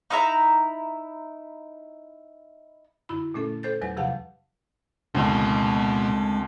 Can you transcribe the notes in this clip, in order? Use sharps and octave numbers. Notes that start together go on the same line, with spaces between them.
D#4 E4 E5 A#5
F#2 D3 E4 B5
A#2 A3 C#4 A4
A4 C5 G6 A6
E2 F#3 B4 G#5 A6
C3 F3 G4 F5 F#5 A5
F#1 D2 B2 G#3 C4